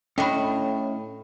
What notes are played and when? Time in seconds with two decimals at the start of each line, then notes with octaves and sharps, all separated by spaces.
0.18 A2 A3 C#4 D4 D#5 G5 B5